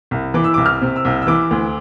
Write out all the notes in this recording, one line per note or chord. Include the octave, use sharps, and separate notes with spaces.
C2
E3 D6
E6
C2 D6
F6
C3
E6
C2
E6
E3 D6
D2